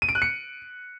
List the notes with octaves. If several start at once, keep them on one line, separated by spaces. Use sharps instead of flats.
D#7
D7
F#6
C#7